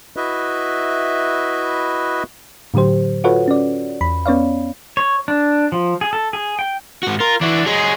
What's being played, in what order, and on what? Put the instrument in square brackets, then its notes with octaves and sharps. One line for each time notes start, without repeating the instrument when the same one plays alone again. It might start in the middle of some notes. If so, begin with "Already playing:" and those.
[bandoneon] E4 F#4 B4 D#5 E5
[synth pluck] A2 D3 F#3 G4 C5
F4 F#4 A4 B4 C#5 F#5
C#4 D5
E2 B5
B3 C#4 C#5 D5 F5
[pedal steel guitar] C#5
D4
F3
G#4
A4
G#4
G5
[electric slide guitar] G#2 F#4
[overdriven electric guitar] F4 [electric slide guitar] A#4
[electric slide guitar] E3 E4 [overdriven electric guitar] D4 F#4
[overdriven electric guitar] F#3 G#3 [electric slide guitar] G#4